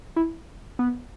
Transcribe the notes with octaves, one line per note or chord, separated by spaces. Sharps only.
E4
B3